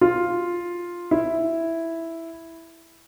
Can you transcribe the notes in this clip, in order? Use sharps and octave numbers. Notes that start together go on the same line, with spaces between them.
F4
E4